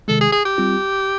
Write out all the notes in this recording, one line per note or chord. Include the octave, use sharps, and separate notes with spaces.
C3 D#3 G#3 A4
G#4
G#4
G4
G3 C4 F4